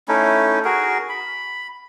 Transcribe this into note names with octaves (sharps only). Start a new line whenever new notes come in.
A3 C#4 D#4 E4
F#4 G#4 A#4
B5